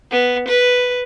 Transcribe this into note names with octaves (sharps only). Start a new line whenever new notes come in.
B3
B4